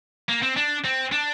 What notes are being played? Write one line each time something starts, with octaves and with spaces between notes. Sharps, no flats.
A#3
C4
D4
C4
D4